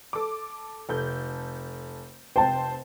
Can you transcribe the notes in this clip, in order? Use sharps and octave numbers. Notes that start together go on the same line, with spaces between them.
A4 D6
F1 A4 G6
F1 C3 C5 G5 A5